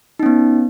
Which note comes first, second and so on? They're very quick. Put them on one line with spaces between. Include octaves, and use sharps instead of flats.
D#4 C#4 B3